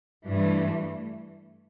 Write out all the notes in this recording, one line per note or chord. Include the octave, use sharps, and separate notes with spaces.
G2 E3 A3